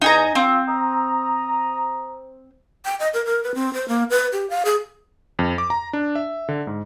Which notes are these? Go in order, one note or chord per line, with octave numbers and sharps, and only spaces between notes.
E2 D#4 G#5 A#5
C4 F4
A#5 D#6
G5
D#5
A#4
A#4
B4
C4
C5
A#3
B4
G4
F5
G#4
F2
D6
A#5
D4
E5
D3
G#2